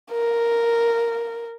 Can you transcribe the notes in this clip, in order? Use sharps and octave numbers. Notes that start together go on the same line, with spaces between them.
A#4